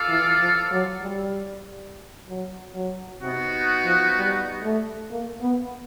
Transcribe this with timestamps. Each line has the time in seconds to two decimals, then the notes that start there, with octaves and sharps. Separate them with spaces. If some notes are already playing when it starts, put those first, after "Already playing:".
Already playing: F4 A4 D5 F5
0.08 E3
0.39 F3
0.71 F#3
1.02 G3
2.28 F#3
2.74 F#3
3.21 C3 B3 D#4 F#4
3.84 F3
4.17 G3
4.63 A3
5.11 A#3
5.41 B3